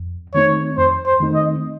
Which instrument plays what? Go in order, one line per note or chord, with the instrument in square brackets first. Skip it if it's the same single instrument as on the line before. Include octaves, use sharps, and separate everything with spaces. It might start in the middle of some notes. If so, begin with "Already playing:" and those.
Already playing: [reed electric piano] F2
[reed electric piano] D#3 A3 C4 D#4 [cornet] C#5
[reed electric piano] F2 [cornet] C5
[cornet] C5
[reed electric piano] D#3 A3 C4 D#4
[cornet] D#5